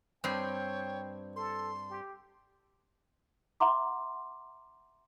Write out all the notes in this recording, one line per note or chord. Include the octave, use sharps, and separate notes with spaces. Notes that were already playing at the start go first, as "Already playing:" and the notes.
G2 C4 C#5 G5
A4 C6
G4
E5 F#5 A#5 C6 D6